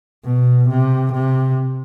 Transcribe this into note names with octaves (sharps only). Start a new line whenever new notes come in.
B2
C3
C3